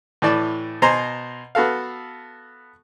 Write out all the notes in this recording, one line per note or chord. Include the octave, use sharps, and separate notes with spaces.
A2 E3 D5 A5
B2 C5 G#5 A#5
B3 F#4 A4 F5